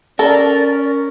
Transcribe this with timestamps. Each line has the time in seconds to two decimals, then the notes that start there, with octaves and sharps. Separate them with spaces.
0.19 C#4 A4 A#4 D5